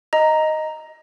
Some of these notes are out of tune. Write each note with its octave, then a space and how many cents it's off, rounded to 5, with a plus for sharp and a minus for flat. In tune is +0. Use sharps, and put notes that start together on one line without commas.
D#5 +0 A#5 +0